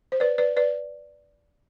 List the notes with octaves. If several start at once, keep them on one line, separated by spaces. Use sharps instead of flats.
C5
B4 D5
B4 D5
B4 D5